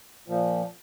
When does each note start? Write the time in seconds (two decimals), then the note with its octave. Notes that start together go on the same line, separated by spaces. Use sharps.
0.28 A#2 F3